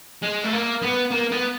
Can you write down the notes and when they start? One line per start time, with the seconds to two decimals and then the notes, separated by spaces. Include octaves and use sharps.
0.22 G#3
0.43 A3
0.52 A#3
0.82 B3
1.11 A#3
1.32 B3